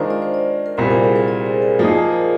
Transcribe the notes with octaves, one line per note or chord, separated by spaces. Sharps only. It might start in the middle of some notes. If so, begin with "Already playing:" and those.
Already playing: D#3 G#3 D4 F4 A#4 C5 D5
D5
C5
D5
A#4
C2 A#2 G3 C5
A#4
G#4
C5
D5
G#4
A#4
F3 A#3 D#4 G#4